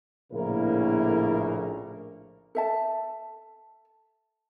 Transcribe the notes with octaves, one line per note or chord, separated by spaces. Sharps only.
A#1 A2 C#3 A#3 E4 A#4
A4 E5 A5